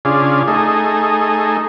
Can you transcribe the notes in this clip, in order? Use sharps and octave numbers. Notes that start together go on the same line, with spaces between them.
C#3 D4 F4 G#4
A3 D#4 G#4